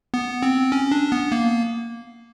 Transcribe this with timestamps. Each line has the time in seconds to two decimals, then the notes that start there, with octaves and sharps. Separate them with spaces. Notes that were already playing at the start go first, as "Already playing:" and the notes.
0.14 B3
0.43 C4
0.72 C#4
0.91 D4
1.12 B3
1.32 A#3